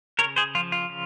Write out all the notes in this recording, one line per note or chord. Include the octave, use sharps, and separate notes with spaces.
C#3 A#4 C#5
G#4 C5
F3 F4
F4
C#3